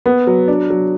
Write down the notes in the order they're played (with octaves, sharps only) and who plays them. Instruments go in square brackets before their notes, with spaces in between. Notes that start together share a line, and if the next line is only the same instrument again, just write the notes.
[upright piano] B3
F#3
D4
F#3